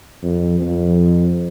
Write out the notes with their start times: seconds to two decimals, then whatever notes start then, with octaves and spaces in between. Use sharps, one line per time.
0.22 F2
0.61 F2